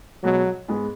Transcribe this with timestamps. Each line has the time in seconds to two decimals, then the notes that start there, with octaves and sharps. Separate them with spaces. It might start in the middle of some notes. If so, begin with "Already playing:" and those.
0.23 B2 F#3 G#3 B3 F#4
0.68 G#2 G#3 B3 G#4 B4